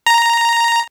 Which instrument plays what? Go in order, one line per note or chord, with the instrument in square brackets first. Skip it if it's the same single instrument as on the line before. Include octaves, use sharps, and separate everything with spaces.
[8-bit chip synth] A#5